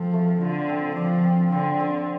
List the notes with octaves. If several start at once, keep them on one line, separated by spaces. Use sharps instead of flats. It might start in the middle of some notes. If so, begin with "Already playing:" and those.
Already playing: F3 C4 A4
A3
D3 F4
C4
F3 D5
C4
D3 C4
C4